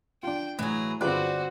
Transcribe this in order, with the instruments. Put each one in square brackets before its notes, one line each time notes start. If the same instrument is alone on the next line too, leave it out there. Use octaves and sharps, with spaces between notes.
[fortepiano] D4 F4 [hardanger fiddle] G5
[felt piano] A2 [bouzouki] E3 F#3 [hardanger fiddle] G#4 A#5
[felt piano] G1 F#6 [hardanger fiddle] C4 F#4 [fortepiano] F4 G#4 B4 [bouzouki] D5